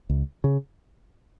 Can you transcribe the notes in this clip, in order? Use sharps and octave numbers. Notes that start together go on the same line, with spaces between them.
C#2
C#3